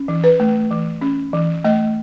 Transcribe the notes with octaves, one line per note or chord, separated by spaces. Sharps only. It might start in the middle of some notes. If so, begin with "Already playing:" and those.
Already playing: C#4
E3
B4
A3
E3
C#4
E3
A3 D#5